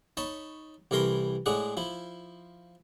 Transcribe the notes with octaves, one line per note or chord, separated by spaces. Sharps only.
D#4 C#5 A5 B5
C2 E3 A4 A#4 C6
A2 G#3 D4 G#4 F#5
F3 E4